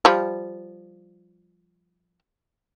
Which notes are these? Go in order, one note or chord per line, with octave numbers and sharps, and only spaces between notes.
F3 G3